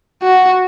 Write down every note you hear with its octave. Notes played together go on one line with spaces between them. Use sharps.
F#4